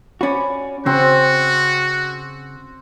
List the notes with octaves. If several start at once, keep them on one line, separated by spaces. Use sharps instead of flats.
C#4 F#4 D5 B5
C#3 C4 F#4